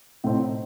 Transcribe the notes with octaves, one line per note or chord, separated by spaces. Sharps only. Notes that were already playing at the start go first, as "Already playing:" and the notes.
A2 A3 C4 D#4